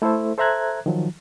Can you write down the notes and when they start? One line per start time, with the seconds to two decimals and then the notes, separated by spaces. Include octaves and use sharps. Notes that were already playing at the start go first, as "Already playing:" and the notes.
0.02 A3 E4 A4 C5 E5
0.38 A4 C5 E5 A#5 F#6 G#6
0.86 D#3 F3 F#3